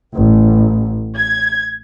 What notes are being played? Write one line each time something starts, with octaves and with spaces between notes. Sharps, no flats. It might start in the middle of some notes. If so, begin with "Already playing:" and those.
A1
G#6